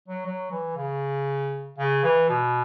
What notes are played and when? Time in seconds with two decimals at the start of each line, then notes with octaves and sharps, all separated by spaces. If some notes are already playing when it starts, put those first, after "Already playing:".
0.08 F#3
0.26 F#3
0.51 E3
0.76 C#3
1.78 C#3
2.04 E3
2.29 B2